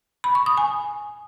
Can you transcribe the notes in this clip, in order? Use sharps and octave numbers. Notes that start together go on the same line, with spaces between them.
B5
C#6
D#6
G#5